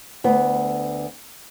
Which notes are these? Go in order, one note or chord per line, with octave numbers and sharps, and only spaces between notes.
D2 B3